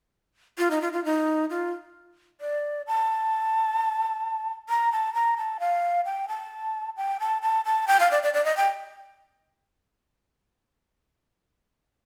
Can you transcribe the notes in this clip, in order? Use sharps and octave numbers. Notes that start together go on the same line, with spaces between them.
F4
D#4
F4
F4
D#4
F4
D5
A5
A#5
A5
A#5
A5
F5
G5
A5
G5
A5
A5
A5
G5
F5
D5
D5
D5
D#5
G5